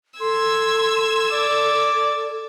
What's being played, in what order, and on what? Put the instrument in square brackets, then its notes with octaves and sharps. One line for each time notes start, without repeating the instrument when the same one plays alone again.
[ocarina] A4 [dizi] C6 [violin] E6 G#6
[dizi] D5 [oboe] D6